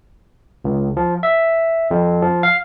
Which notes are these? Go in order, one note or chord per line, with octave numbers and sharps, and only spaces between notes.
C#2
F3
E5
F2
F3
F5